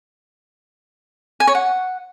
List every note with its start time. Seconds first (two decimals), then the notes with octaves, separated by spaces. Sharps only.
1.40 G#5
1.47 C#5
1.55 F#5